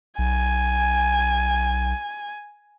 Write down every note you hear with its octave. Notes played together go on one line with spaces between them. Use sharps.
B1 G#5